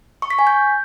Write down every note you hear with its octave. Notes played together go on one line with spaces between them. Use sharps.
C#6
B6
G#5
G6